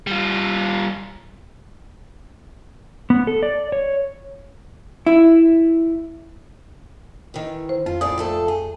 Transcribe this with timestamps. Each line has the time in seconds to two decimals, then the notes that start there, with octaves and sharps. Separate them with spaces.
0.07 G3 F4
3.10 B3
3.27 A4
3.43 D5
3.72 C#5
5.06 E4
7.34 D#3 E3
7.69 C5
7.86 F2 F4
8.01 A2 G#4 D5 D#6
8.18 F2 A3 A4
8.48 G#4